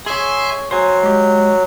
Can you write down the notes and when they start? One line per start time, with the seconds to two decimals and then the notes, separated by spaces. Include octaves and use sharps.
0.06 G#4 C#5 E5 G#5 C6
0.71 F#3 C5 G#5
1.03 G#3 G4